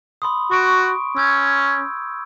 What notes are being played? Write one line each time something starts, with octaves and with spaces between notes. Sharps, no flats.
B5 C6 D#6
F#4 C#6 D7
C#4 E6 G6 G#6